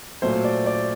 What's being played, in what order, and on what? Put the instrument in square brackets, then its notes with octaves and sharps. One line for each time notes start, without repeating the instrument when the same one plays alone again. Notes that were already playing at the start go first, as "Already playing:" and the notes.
[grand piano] A#2 F#3 A3 [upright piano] C5
[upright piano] D5
D5